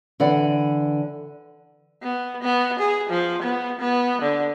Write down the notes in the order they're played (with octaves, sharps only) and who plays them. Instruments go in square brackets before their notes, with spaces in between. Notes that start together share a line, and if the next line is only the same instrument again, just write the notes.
[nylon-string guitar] D3 E3 D5 F#5
[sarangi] B3
B3
G#4
F3
B3
B3
D3